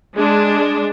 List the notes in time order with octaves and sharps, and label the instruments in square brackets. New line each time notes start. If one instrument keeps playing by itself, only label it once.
[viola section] G#3 D4